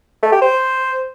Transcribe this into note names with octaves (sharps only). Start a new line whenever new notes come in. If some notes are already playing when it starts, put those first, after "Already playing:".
A3
G4
C5